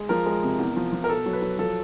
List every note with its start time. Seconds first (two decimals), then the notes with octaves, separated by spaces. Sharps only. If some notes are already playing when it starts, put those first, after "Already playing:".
Already playing: G#3
0.09 F3 A#4
0.26 G#3
0.43 C3
0.59 E2
0.76 F3
0.93 F3
1.04 A#4
1.09 B2 A4
1.26 F#3
1.33 B4
1.42 F#3
1.58 F3 A4